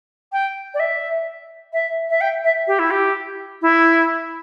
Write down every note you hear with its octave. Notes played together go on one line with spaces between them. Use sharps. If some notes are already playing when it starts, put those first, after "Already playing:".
G5
D5
E5
E5
E5
G5
E5
G4
E4
G4
E4